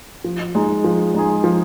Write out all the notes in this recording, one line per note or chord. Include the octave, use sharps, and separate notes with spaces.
F3
G#3 D#4 G#4
F3
G#3 D#4 G#4
F3